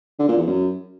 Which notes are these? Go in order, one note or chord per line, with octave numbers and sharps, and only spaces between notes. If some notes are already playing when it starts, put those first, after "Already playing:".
D3
A#2
E2
F#2